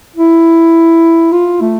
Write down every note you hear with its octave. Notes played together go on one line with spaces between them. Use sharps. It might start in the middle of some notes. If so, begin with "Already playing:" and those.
E4
F4
A3